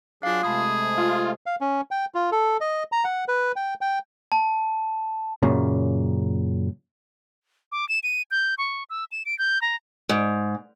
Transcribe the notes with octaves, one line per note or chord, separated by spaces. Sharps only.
F#3 D4 F4 G#4 F5
C3 G#3 A3 G#4 A5 B5 D#6
F4
F5
C#4
G5
F4
A4
D#5
A#5
F#5
B4
G5
G5
A5
F#2 A#2 C#3
D6
E7
D#7
G6
C#6
E6
E7
D7
G6
A#5
G#2